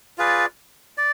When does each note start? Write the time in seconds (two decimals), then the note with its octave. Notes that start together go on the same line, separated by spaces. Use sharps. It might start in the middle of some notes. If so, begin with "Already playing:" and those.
0.18 F4 G#4 B4 D5
0.98 D5